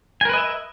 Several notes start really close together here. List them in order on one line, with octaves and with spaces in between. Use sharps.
G#5 A#4 B4 D#5 E5